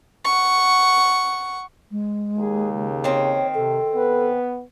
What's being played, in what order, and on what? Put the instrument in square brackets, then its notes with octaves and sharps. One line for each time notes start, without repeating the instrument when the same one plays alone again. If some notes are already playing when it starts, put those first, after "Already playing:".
[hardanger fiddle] F#5 C#6
[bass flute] G#3
[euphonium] D#2 [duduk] G#4
[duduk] C#3
[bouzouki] D#3 C4 [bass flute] C#5
[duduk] C3 [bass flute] A4
[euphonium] B3 [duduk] B4